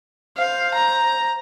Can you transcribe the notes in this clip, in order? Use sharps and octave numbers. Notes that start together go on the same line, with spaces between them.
C5 F5
A#5